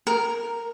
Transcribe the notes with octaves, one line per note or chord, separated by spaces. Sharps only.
A#4